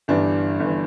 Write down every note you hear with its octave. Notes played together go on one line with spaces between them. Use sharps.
G1 G2 E3 D4
G1 E3